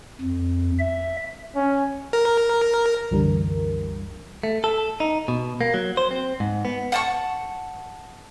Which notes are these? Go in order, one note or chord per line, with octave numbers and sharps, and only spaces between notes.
F2
E5
C#4
A#4
C2 F#2 D3 E3 G3 A#4
A3
A4
D#4
B2
A#3
F#3
C5
C4
G#2
B3
F#5 A5 C#6